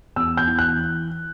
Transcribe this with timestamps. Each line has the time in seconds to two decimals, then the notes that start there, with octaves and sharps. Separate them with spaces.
0.16 E2 E6
0.37 G6
0.47 E3
0.59 F#6